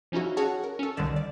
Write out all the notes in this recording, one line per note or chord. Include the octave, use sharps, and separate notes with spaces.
F3 C#4 D#4 E4 F#4
C#4 F#4 G#4 C#5 F#5 A5
A#4
C#4 A4
C2 D3 D#3 G3 D5 E7
D5